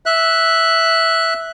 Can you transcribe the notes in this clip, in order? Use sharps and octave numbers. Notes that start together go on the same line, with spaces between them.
E5 F#6